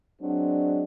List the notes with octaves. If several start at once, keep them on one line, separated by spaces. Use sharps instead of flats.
F#3 G#3 C4 D4